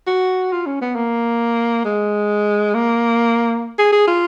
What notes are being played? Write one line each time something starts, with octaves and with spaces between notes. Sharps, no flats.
F#4
F4
C#4
B3
A#3
G#3
A#3
G#4
G#4
F4